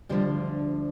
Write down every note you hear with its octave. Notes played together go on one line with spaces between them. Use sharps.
D2 D3 F3 G3